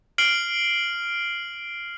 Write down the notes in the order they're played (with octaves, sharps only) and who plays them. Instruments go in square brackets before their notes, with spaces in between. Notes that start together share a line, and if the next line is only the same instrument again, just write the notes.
[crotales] F6 C7 D7 F#7